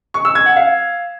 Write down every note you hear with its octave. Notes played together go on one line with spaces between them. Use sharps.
C#6
E6
G#6
F#5
F5